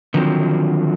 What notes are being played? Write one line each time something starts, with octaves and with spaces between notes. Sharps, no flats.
D3 D#3 F3 F#3 A#3 C4